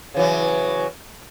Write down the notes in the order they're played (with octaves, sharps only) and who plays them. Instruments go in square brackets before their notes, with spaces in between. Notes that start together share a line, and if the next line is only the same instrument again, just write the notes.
[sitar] C#3 E3 F#3